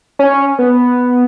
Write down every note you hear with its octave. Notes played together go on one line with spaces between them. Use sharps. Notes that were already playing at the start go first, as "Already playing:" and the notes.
C#4
B3